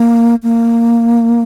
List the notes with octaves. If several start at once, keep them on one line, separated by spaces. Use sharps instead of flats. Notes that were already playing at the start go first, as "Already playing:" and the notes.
Already playing: A#3
A#3